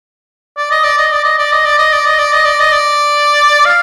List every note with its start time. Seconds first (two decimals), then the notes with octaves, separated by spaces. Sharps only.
0.57 D5
0.71 D#5
0.84 D5
0.97 D#5
1.12 D5
1.24 D#5
1.38 D5
1.52 D#5
1.65 D5
1.78 D#5
1.92 D5
2.06 D#5
2.18 D5
2.33 D#5
2.45 D5
2.60 D#5
2.72 D5
3.65 F5